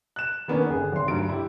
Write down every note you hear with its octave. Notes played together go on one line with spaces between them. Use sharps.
F#6 E7
D#3 A#3 B3 C#4 D4
G1 G#4
G#1 C6
D2 G2 F#3 D7
E4 G4